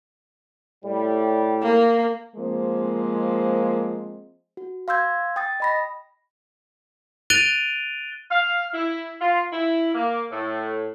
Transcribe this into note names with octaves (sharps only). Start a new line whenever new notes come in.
A2 G3
A#3
F3 G#3 A#3 C4
F#4
F5 C6 E6 G6 G#6
G5 D#6 A6
D#5 B5 A#6
F#6 A6 D7 D#7 F7 G7
F5
E4
F4
E4
A#3
A2